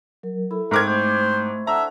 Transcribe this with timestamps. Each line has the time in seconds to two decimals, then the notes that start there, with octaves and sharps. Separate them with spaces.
0.23 F#3 A#4
0.51 E4 A4
0.71 G#2 C4 E4 A#4 C#6 D6 G#6
0.87 A3 C5
1.67 D4 A4 E5 F#5 A5 A#5